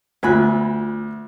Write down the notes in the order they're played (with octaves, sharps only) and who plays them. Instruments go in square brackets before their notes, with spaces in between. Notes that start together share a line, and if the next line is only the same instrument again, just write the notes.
[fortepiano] D2 F#6 [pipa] B3 G#5 B5 [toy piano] F4 A#4